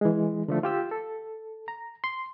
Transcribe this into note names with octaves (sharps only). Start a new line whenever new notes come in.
E3 G#3
D3 F3 A3
F4 G4 E6
A4
A#5
C6